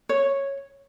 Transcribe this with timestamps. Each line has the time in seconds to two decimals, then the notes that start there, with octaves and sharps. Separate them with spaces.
0.09 C#5